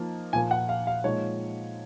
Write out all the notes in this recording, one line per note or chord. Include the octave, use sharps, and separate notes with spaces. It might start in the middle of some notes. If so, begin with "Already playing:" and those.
Already playing: F3 A#3 D#4
A#2 F3 A#3 G#5
F#5
F5
F5
A#2 F3 G#3 D#4 C#5